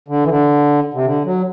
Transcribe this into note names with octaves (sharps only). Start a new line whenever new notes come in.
D3
E3
D3
C3
D3
F#3